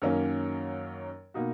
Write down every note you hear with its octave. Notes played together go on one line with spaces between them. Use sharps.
F#2 D#3 F#3 A#3 C#4
B2 A#3 D#4 F#4